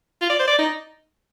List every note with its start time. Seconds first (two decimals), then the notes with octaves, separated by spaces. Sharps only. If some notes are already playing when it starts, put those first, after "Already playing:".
0.22 F4
0.30 D5
0.39 C5
0.48 D5
0.59 D#4